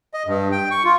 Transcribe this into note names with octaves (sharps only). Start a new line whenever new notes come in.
D#5
G2
G5
C#6
F4